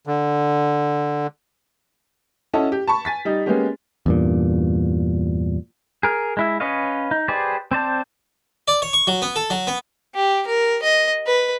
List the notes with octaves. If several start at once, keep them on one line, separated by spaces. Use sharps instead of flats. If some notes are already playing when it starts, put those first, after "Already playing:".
D3
C#4 E4 F#4 A4 D#5 A5
G4
A5 B5 C#6
G#5 A6 B6
G3 D#4
G#3 A#3 B3 C#4 G4
E2 G2 A#2
G#4 A#4
G#3 E4 E5
C#4 B4 C#5 D#5 F5
D#4
G4 G#4 B4 C5 D5
C4 C5 D5 A5
D5
C#5
C#6
F#3
B3
A4
F#3
B3
G4
A#4
D#5
B4